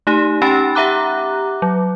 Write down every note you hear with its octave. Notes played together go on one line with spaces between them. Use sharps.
A3 D#4 G4
C#4 D#4 G4 G5 B5 A6
G4 E5 F#5 A#5 D6 F#6
F#3